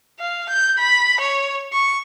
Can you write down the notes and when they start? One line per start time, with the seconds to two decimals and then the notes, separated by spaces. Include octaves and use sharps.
0.20 F5
0.50 G6
0.78 B5
1.21 C#5
1.73 C#6